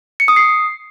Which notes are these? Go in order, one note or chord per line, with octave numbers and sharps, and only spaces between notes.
C#7
D#6
C7